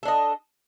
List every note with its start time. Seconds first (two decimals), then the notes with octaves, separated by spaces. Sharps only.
0.03 A4
0.05 D4
0.08 D#5